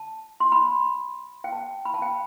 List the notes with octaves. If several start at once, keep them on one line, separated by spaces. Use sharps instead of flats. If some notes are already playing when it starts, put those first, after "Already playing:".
Already playing: A5
C6
B5
G5
A5
B5
A5
G5